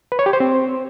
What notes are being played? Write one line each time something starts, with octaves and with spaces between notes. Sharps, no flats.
B4
C#5
G4
C5
C4